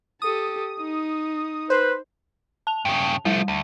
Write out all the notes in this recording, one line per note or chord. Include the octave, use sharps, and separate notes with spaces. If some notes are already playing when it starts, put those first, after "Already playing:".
G4 A4 D#6
D#4
B4 C5
A5 F7
G2 C#3
F3 G3 A3
D2